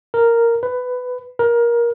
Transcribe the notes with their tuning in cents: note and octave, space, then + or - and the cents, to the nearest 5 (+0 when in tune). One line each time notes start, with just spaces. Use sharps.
A#4 -5
B4 +15
A#4 +20